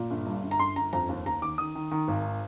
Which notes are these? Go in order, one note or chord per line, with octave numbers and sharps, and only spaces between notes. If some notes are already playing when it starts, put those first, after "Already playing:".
Already playing: A#2
G1
G2
G1
A#5
G1 C6
G1 A#5
F2 A#5
D#2
D#2 A#5
D#3 D6
D#3 D#6
D#3
D#3
G#1